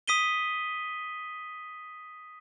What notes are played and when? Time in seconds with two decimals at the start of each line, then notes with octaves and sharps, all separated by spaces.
0.08 D#6 B6 D#7 G7